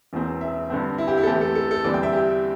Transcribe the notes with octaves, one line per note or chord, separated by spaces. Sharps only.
E1 E2 E3 C4
E5
G2 D3 C4
E4
G4
E4
A4
E2 E3 A3 C4 G4
A4
A4
A4
E2 D3 G3 C4 D5
G5
E5
G4